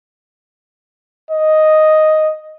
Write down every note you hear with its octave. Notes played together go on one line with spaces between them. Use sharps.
D#5